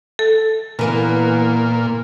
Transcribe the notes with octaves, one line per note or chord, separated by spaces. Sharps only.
A4
A#2 E3 A#3 B3